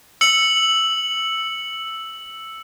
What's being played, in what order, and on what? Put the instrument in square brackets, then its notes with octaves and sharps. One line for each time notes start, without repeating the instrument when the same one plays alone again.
[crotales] E6 C#7 F#7